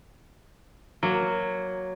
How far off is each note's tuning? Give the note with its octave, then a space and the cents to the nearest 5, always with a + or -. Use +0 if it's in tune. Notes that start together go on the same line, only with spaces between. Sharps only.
F#3 +0 A#3 +0